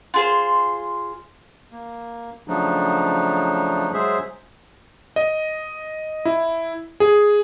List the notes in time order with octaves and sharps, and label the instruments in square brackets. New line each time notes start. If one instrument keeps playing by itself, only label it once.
[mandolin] F4 G#4 C5
[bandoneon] A#3
C#3 F3 F#3 A3 D4 D#4
F#3 G#3 G#4 C5 E5
[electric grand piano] D#5
E4
G#4